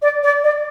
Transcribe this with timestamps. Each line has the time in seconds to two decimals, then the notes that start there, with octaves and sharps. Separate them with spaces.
0.01 D5
0.23 D5
0.43 D5